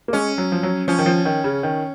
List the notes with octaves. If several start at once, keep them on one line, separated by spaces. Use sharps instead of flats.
A#3
G#3 C#4
F#3
F3
F#3
F3 C#4
D#3
F3
D#3
C#3
D#3